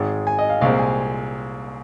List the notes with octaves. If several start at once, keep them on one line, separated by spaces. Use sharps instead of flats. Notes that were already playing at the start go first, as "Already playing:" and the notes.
Already playing: G#1 G#2 G#3
G#5
D#5
F5
C2 A#2 G#3 C4 F5
G#5